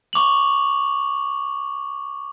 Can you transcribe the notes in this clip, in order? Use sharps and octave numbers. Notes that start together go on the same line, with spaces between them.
C#6 D6 F7 F#7